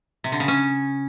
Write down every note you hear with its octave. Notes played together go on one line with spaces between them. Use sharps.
C3
D3
C#3
C#4